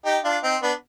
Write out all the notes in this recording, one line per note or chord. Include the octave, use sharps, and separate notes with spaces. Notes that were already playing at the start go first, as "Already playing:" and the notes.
D#4 G4
D4 F4
C4 D#4
B3 D4